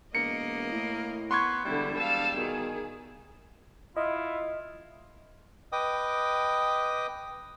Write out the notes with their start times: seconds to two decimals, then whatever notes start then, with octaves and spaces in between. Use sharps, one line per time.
0.15 E1 A#3 D#5 C#7
0.72 A2
1.31 B3 C6 C#6 G#6
1.65 E1 D3 G3 E4
1.96 F5 A5 E6
2.36 B2 D#3 G#4
3.97 E4 F4 D#5
5.72 B4 D#5 G5 D6 D#6